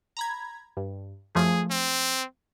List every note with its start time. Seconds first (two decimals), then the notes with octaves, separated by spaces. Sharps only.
0.17 A#5 B5 G#6
0.77 G2
1.35 F#2 F3 A3 G#4
1.71 C4